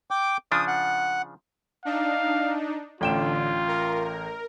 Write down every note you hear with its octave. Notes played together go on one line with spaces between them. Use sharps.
G5 D6
C#3 F3 D4 D#6
F#5
D4 D#4 F5
A1 D3 F4 G5 E7
A#4